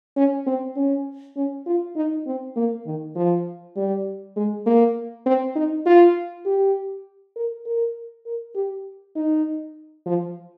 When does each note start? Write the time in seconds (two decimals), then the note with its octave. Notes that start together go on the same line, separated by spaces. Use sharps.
0.17 C#4
0.47 C4
0.76 C#4
1.36 C#4
1.67 F4
1.96 D#4
2.27 C4
2.56 A#3
2.86 D#3
3.16 F3
3.76 G3
4.37 G#3
4.66 A#3
5.26 C4
5.56 D#4
5.86 F4
6.46 G4
7.36 A#4
7.66 A#4
8.26 A#4
8.55 G4
9.16 D#4
10.06 F3